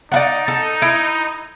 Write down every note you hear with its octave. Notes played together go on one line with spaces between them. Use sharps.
D#4 D5 F5 F#5
A4
E4